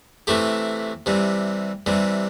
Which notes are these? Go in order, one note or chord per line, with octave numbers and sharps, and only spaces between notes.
C3 E3 A3 E4 G4
C3 E3 G3
C3 E3 G3